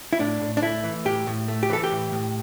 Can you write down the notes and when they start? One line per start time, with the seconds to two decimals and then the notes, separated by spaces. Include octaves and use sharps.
0.13 E4
0.19 A2 D4
0.41 A2
0.57 D4
0.62 A3 E4
0.84 E3
1.05 A2 G4
1.27 A2
1.48 A3
1.63 G4
1.70 E3 A4
1.84 G4
1.91 A2
2.12 A2